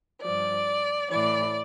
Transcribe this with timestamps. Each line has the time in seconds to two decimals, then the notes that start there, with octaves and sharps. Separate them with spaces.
0.22 G2 F3 D5
1.09 A2 E3 D5